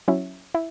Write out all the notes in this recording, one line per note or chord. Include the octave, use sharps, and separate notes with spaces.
F#3 C#4 E4
E4